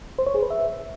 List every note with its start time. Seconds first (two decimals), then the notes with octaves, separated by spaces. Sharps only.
0.19 C5
0.27 C#5
0.35 G#4
0.42 B4
0.50 E5